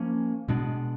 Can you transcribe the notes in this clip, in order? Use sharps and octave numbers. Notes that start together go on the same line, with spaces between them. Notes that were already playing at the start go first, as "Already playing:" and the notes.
Already playing: F3 A#3 C#4
B2 G#3 B3 D4